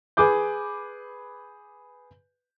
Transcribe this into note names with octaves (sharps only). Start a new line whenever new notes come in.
G#4 B4 D6 G6